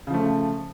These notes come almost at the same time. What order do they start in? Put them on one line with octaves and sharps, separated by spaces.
C#3 F3 A3